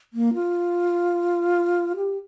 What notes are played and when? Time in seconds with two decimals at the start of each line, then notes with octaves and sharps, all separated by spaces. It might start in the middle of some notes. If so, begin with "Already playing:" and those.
0.13 A#3
0.34 F4
1.96 G4